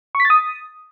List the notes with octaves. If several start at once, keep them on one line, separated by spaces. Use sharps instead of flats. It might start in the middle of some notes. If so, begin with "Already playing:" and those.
C#6
B6
A6
D#6